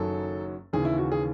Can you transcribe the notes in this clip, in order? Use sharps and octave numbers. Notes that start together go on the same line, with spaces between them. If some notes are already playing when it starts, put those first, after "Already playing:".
Already playing: F#1 F#2 D#3 F#3 A4
D#2 C#3 E3 G#4
E4
F#4
G#4